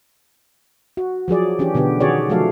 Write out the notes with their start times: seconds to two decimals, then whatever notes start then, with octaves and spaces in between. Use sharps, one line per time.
0.97 F#4
1.28 F3 F#3 G#4 D5
1.59 E3 C#4 D4 G4
1.75 B2 D3 B3 G4
2.00 D#3 C#4 F#4 G#4 C#5 D5
2.29 F3 F#3 A3 A4 F5